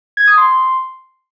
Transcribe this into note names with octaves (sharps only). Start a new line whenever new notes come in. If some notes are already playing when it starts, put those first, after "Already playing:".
G#6
D#6
C6